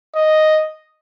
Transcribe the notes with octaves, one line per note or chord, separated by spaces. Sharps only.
D#5